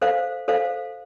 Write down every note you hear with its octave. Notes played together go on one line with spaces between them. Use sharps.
A4 C5 F5
A4 C5 F5